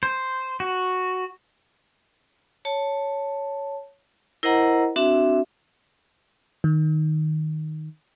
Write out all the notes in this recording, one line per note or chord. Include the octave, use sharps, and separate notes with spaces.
C5
F#4
C#5 A5
E4 A#4 C5 D#5 F#5 A#5
C4 D4 F#4 E5
D#3